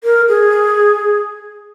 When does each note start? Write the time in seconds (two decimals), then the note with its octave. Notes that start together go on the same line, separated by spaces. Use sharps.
0.04 A#4
0.28 G#4